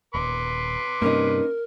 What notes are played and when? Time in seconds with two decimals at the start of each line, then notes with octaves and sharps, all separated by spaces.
0.15 D#1 B4 C6 D6
1.02 G2 C3 A#3 C#4 D#4 A#4